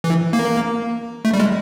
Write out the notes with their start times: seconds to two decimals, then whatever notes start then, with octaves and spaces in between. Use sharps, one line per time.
0.04 E3
0.33 A#3
1.25 A3
1.34 G3
1.40 G#3